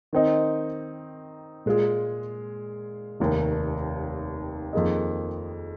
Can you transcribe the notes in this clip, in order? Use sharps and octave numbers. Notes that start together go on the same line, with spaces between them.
D#3 C4 D#4
A#2 G#3 F4 G#4
F1 D#2 D#3
F2 D#3 A#3 G#4 D#5